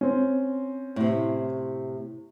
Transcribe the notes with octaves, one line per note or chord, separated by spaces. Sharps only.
C4 C#4
A2 C3